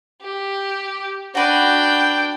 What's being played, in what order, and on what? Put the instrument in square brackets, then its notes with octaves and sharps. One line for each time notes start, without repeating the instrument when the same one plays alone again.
[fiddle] G4
[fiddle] D4 G5 [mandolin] F#4 B4